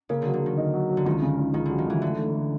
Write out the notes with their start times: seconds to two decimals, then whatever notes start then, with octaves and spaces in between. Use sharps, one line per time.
0.09 C#3 A#3
0.22 D3 F#3
0.34 D3
0.41 D#3 F#3
0.57 D#4
0.74 F#3
0.90 F#3
0.97 D3
1.06 C#2 D#3
1.22 C#3
1.38 C#2
1.54 C#2 D#3
1.66 D3 F#3
1.78 D#3
1.86 C#2 E3
2.02 D3 A3
2.18 A3
2.34 A3